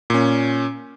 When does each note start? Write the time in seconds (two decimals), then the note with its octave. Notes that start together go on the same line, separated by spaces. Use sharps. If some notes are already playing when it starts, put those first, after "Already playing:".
0.10 A#2 C#4